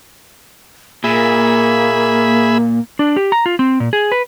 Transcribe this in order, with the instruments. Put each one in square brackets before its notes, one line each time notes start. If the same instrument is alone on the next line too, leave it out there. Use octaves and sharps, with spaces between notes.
[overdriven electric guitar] A#2 [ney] A#3 [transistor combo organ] G#4 E5 B5
[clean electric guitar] D4
G4
A#5
F4
C4
A#2
G#4
B4